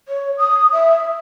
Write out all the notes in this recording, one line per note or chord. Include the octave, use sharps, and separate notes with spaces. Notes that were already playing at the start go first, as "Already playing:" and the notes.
C#5
D#6
E5